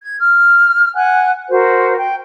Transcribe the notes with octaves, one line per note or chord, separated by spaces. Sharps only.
G#6
F6
F#5 G#5 F#6
F#4 A#4 C5
G5